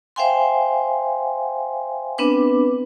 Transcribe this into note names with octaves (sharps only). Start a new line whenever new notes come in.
C5 E5 F5 G5 G#5 C6
B3 C4 D4 B4 D6